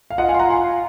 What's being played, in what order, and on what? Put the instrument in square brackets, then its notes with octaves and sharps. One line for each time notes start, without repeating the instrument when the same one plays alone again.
[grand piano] F5
[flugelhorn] F4 [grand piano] D#5 F#5
[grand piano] F5 G#5
C6
F#5 A#5
G#5 C6